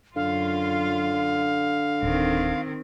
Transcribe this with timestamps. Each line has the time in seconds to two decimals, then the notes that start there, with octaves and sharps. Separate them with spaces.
0.16 F#2 D3 F4 F5
2.03 D1 D#3 C4